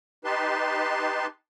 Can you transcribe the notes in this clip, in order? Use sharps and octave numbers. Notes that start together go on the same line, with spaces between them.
D#4 G4 B4 A5 C6